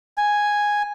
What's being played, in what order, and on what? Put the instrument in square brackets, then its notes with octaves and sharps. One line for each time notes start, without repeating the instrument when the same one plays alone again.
[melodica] G#5